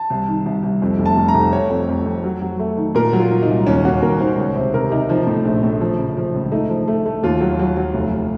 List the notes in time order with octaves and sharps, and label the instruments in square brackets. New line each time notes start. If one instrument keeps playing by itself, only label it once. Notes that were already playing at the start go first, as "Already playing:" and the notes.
Already playing: [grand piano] A5
C2
D#3
C2
C2
F2
F1
A5
F1
A#5
F1
A3 C#5
F2
F2
F2
F#3
F#3
A3
D#3
A#2 A#4
F#3
F4
F#3
D#4
C2
D#2 C#4
A#3 F#4
D#2 A#4
D#3 C5
C#2 C#5
C3 C5
C3 A#4
C3 D#4
F3 D#4
A2
A#1
A2
F3
C#3
F3
C#2
A3 D#4
F3
A3
A3
D#2 F4
F#3
F#3
F#3
F1